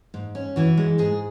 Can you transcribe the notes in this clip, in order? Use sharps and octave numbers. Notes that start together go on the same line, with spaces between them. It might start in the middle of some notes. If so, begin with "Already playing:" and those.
G#2
C#4
E3 F#4
G#3
G#2 G#4